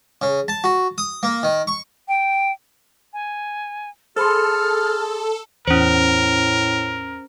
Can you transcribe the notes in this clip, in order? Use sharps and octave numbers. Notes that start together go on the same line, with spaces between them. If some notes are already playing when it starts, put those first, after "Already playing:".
C#3
A5
F#4
D#6
A#3
D#3
C#6
G5
G#5
G#4 A4 C5 B5 C6 F6
E2 A2 C#4 A#4 C5